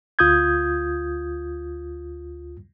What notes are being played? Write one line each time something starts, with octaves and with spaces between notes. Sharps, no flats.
D2 F4 D#6 G6 G#6